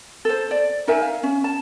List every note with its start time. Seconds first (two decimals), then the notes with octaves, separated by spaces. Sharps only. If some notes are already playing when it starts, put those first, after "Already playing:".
0.25 A4 C5
0.51 D5
0.87 D#4 A#4 E5 G#5
1.02 F5
1.23 C#4
1.44 A5